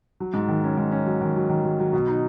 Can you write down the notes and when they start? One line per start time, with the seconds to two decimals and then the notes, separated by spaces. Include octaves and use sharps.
0.20 F#3
0.34 G#2
0.48 D#3
0.64 C#4
0.78 G#2
0.92 C#4
1.06 F#3
1.21 D#3
1.36 F#3
1.49 D#3
1.65 F#3
1.80 F#3
1.93 B2
2.07 D#4